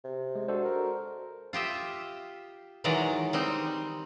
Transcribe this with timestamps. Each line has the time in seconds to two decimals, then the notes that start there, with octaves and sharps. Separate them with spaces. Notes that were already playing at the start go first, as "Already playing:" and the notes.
0.04 C3
0.35 G#3
0.48 D4 F#4 A4 C5
0.65 A#4
1.53 F4 G4 D#5 E5
2.84 D#3 E3 F#3 G#3 D5 A#5
3.33 G3 C4 D#4